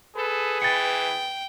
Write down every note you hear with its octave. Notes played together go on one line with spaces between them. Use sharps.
G#4 A4 B4
E3 G5 A6 C#7